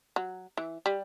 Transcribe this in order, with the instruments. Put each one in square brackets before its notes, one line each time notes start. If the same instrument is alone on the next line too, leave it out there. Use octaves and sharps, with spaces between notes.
[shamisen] F#3
E3
G3